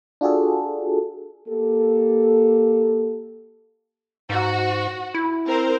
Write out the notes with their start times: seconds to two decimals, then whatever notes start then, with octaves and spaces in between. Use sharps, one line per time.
0.21 D4 F4 F#4 G#4 A4
1.47 A#3 G4 A4
4.30 G#2 F#4
5.14 E4
5.47 C4 A#4 C5